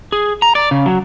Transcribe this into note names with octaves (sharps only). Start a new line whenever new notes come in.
G#4
A#5
D5
C#3
F#3